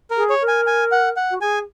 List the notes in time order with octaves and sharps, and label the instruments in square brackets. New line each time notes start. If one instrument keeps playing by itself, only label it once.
[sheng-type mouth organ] A#4
[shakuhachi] G#4
[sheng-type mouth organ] C#5
[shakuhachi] A#4
[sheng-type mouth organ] G#5
G#5
F#5
F#5
[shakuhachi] F#4
[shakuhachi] G#4 [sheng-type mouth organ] G#5